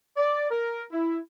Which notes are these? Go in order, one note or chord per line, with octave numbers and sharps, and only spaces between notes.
D5
A#4
E4